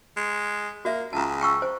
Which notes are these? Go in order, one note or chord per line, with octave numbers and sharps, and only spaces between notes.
G#3
A#3 F#4 E5
C#2 A5 A#5
G5 C#6 E6
C5